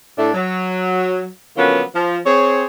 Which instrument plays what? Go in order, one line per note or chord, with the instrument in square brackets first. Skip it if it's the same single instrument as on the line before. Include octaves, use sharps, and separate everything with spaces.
[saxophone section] A2 A3 D4
F#3
D3 F3 F#3 A#3 B3 C#4
F3
C4 G#4 C#5